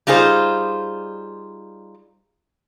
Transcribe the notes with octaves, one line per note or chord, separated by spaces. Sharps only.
G3 D#4 F4 G#4 C5